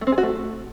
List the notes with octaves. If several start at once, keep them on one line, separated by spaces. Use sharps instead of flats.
A3
C4
G#4
F#4
A3